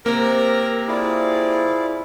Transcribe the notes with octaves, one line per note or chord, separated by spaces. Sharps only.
C3 A#3 A#4
E4 F4 G#4 D5